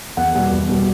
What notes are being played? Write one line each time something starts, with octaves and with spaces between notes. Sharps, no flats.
E2 F#5
B2 G3
E2
B2 G3